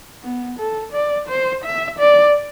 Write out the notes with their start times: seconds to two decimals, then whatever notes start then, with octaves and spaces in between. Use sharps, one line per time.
0.24 B3
0.59 A4
0.93 D5
1.28 C5
1.64 E5
1.99 D5